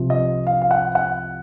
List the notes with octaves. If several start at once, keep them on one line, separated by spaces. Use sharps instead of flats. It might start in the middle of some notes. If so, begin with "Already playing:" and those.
Already playing: C2 C3 F3
D#5
F5
F5
F#5
F#5